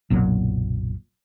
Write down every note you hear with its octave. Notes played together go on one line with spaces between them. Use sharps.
F#1 B1 A#2 F#3